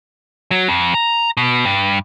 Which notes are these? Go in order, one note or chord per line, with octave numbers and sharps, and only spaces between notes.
F#3
F2
A#5
B2
G2